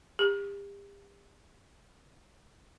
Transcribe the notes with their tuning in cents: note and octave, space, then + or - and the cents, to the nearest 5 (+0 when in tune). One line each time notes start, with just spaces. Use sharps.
G4 +35